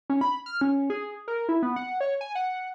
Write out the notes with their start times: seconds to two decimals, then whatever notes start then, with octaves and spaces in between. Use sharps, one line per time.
0.10 C#4
0.21 B5
0.46 F6
0.61 C#4
0.90 G#4
1.28 A#4
1.49 E4
1.63 B3
1.76 F#5
2.01 C#5
2.21 G#5
2.35 F#5